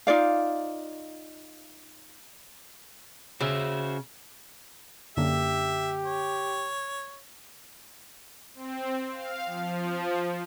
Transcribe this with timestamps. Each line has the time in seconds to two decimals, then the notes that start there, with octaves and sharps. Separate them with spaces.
0.07 D#4 F4 D5 F5
3.41 C#3 F#4 C5 E5
5.17 F#2 D3 A#3 G4 E5
6.05 C#5
8.54 C4
9.11 F5
9.46 F3